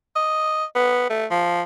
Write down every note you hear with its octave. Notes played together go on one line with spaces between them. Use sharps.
D#5
B3
A3
F3